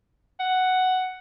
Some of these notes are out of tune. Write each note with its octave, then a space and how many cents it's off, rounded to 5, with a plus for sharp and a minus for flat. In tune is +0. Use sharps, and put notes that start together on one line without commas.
F#5 +5